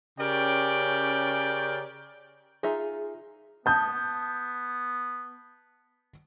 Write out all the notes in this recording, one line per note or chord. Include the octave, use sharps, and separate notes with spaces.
C#3 C#4 G4 A#4 D5 G5
D#4 F4 G#4 E5
B3 A5 D#6 G6